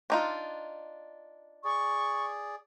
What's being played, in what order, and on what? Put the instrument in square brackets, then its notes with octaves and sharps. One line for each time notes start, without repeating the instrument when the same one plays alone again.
[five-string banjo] D4 D#4 F4
[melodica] G#4 D5 [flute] C#6